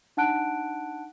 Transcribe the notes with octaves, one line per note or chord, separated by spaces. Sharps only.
D4 D#4 F#5 A5 F#6 D7